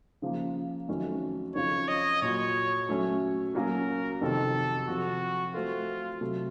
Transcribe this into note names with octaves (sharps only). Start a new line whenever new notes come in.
C#3 F3 A#3
F2 D#3 F#3 A3 C#4
F2 C#3 F3 C#5
D#5
A#2 F#3 A#3 F4 C#5
F#3 A3 C#4
F#3 A#3 C#4 F#4 A#4
F2 C3 D#3 A4
F2 C3 F3 F#4
A3 C4 F4 F#4 A4
C3 F#3 A3